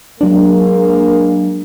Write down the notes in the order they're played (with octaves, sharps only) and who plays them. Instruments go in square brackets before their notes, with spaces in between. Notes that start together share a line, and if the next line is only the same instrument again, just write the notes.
[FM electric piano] F#3 D4 [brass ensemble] G#3 A#3